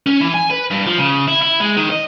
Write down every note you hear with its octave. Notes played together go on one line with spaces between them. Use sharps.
C#4
E3
G#5
B4
G2
F3
C#3
E4
E4
G#3
D#3
D#5